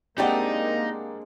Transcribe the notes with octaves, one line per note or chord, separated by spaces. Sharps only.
G#3 A#3 C4 D4 D#4 G4 D5 F#5